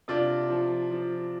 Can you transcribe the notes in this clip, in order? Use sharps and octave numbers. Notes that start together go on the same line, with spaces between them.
C3 D4 F4
F3
F3